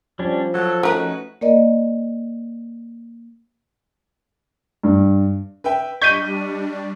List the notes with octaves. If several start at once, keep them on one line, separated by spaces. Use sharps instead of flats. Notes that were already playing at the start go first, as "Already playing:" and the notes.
F3 G3 C#4 D4
F#3 A4
A3 C#4 D#4 F#4 A#4 B4
A#3 A#4 D5 D#5
G2
B4 E5 G5
G3 D4 D#5 C#6 G6 B6 D#7